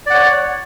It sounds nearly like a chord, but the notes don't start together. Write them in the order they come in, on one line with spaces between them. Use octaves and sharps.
D5 F#5 C#5